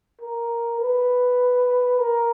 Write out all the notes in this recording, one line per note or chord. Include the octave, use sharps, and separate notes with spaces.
A#4
B4
A#4